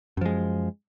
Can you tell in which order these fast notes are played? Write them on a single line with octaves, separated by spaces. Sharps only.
F#2 F3 G#3